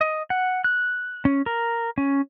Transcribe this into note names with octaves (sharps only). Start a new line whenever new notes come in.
D#5
F#5
F#6
C#4
A#4
C#4